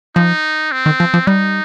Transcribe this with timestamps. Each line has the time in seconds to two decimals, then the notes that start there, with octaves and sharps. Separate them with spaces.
0.16 F3 D#4
0.72 C4
0.86 D#3
1.00 F3
1.14 F3
1.27 G3 D#4